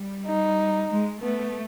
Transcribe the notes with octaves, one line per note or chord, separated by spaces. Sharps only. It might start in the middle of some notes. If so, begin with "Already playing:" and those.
Already playing: G3
D#4
G#3
A3 B3